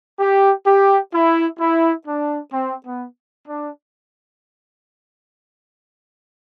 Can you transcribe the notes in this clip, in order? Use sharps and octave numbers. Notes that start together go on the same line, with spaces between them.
G4
G4
E4
E4
D4
C4
B3
D4